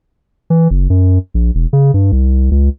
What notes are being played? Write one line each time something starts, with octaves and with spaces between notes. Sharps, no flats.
E3
F#1
F#2
A#1
E1
C#3
G2
C2
C#2